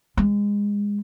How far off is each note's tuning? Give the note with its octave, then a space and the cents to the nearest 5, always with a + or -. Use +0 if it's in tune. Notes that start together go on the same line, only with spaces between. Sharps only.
G#3 -25